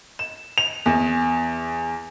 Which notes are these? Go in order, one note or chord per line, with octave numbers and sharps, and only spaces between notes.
E7
F7
E2